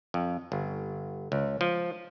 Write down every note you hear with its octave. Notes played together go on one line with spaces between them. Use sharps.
F2
G1
C#2
F3